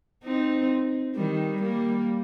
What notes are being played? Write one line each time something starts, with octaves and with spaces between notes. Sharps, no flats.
C4 D#4
D#3 G3
G3 A#3